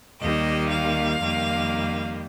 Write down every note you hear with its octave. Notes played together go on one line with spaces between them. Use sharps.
D#2 D#3 G3 A#3 D#5
F5
F2 D#3 G3 A#3